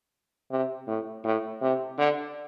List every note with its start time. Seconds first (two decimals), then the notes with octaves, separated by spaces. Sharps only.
0.51 C3
0.87 A2
1.25 A2
1.61 C3
1.98 D3